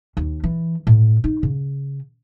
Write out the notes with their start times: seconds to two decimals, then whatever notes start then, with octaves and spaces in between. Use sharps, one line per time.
0.17 D#2
0.44 E3
0.87 A2
1.24 D#4
1.43 C#3